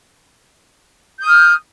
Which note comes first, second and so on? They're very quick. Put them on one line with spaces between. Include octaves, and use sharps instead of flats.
G6 D#6 F6